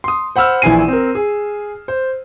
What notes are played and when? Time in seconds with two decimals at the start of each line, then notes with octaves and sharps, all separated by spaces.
0.04 C6 D#6
0.36 C5 F#5 B5 E6 F6
0.62 A#1 E3 E4 G#5 C7 D#7
0.88 C4 A#4
1.15 G#4
1.88 C5